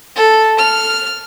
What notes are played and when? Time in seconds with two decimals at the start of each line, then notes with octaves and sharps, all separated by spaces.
0.16 A4
0.58 F6